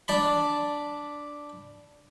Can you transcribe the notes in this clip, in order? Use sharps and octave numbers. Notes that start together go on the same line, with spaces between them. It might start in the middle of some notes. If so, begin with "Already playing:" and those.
D4 A5 B5